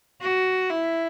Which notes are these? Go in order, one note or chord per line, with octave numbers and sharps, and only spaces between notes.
F#4
E4